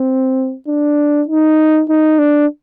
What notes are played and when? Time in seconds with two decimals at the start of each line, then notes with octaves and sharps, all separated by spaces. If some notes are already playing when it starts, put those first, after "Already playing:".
Already playing: C4
0.68 D4
1.29 D#4
1.89 D#4
2.19 D4